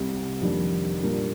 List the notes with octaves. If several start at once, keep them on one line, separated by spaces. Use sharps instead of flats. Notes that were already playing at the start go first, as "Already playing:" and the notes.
Already playing: C2 C3 G3
F2 D#3 G3 A#3 D4
A#2 G3 A#3 D4